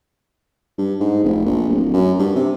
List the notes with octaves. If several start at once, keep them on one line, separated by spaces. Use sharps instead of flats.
G2
G#2
F1
A#1
D1
F#2
G2
C3